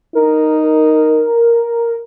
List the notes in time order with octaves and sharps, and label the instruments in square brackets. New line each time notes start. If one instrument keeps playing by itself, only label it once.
[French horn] D#4 [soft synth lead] A#4